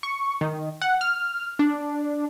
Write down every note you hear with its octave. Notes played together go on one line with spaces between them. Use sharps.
C#6
D#3
F#5
F6
D4